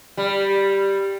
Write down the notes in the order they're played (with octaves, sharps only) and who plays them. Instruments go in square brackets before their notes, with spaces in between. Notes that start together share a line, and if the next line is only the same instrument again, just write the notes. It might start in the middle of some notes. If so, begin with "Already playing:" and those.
[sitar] G3